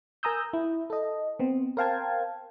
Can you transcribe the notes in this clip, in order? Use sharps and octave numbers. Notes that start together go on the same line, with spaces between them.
A#4 G#5 A#5 D#6 E6 G6
E4
A4 D#5
B3 C4
A#4 C5 F5 G5 A5 G#6